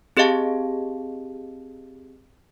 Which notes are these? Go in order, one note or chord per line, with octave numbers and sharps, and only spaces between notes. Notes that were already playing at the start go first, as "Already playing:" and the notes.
C4 G4 G#4 D#5 F5 A5